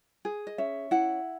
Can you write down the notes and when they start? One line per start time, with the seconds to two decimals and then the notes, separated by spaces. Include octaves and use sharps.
0.25 G#4
0.47 D#5
0.58 C#4 E5
0.91 E4 F#5